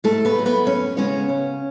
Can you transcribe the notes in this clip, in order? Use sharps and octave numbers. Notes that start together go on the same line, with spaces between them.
G#2 A3 A4
B3 B4
F#3 A3
B3 B4
F#2 C#4 C#5
C#3 G#3 B3 C#4 C#5
C#3